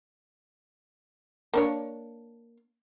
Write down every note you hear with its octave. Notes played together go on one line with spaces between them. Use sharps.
A#3 D4 C#5